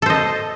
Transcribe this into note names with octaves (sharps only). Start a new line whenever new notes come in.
A4 C5 D#5